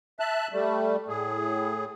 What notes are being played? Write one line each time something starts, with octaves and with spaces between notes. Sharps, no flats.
E5 A5 F#6
G3 A3
A2 G#4